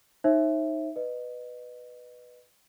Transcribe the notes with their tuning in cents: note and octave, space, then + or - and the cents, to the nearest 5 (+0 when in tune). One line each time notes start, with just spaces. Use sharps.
D#4 +0 C5 +45 E5 +0
B4 +0 D#5 -25